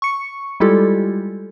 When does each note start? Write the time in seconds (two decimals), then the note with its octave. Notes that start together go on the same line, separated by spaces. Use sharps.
0.02 C#6 C#7
0.60 G3 G#3 E4 F4 G4 A4